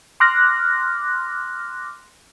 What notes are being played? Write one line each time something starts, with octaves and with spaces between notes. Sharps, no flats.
C6 D6 F6 F#6 A#6